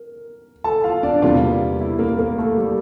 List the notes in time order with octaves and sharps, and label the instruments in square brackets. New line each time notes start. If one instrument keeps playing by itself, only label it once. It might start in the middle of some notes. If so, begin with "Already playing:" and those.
Already playing: [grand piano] A#4
A4 A5
F4 F5
D4 D5
E2 C3 G3 A#3 F4
E4
A#3 A#4
A#3 A#4
A3 A4
G3 G4